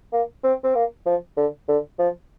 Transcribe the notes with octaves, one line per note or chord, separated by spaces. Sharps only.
A#3
C4
C4
A#3
F3
D3
D3
F3